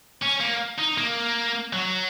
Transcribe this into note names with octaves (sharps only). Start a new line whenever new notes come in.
C#4
A#3
D#4
A#3
F#3